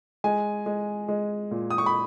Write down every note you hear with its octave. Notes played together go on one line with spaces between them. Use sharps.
G#3 G#5
G#3
G#3
A#2
D#6
C#6
B5